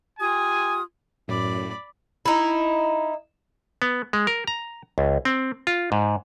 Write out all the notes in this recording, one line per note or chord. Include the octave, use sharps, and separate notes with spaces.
F4 G4 G#5 D#6
F#2 A2 D5 B5
D#4 E4
B3
G#3
A#4
A#5
C#2
C4
F4
G#2